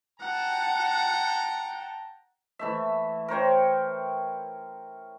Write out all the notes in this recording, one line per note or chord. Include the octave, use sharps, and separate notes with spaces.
F#5 G5 A5 A#5
E3 A3 E5
A#4 C5 C#5 G5